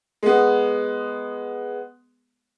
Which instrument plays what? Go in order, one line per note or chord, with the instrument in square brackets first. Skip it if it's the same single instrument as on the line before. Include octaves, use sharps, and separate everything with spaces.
[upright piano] G#3 B3